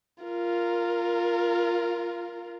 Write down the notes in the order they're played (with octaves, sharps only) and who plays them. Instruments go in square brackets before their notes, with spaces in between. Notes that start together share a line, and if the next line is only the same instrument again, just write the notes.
[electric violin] F4 A#4